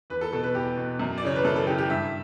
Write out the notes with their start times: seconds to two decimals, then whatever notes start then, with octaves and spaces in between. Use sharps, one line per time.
0.10 E2 B4
0.21 A4
0.33 B2 A4
0.43 B4
0.54 E2 G4
0.77 B2
1.00 F#2
1.18 D5
1.22 C#3 E3 C#5
1.36 B4
1.45 F#2 A4
1.56 A4
1.67 C#3 E3 G4
1.78 G4
1.89 G2 E5